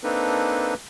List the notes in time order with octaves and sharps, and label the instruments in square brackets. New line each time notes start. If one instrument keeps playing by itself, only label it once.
[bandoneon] A#3 C4 D4 D#4 A4 B4